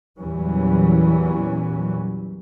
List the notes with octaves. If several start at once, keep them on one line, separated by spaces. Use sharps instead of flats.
E2 A#2 E3 F#3 G3 C#4